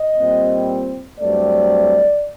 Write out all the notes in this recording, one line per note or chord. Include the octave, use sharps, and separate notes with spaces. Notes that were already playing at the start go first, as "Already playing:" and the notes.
Already playing: D#5
A#2 G3 C4
G2 F#3 A3 C4 D5